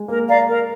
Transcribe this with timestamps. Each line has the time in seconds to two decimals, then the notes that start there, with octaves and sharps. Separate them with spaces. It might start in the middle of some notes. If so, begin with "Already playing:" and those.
Already playing: G#3
0.08 A#3 A#4
0.28 D5 F5 A#5
0.48 A#4